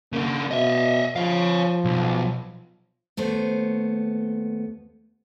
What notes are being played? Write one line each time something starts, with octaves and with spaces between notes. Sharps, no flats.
C#3 A#3 D4
B2 D#5 E5
F3 C#5 F5
B1
D#2 A3 B3 C5